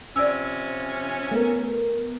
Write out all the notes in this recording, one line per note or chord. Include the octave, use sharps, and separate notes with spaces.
C3 F3 C#4 D5 E6
A3 B3 A#4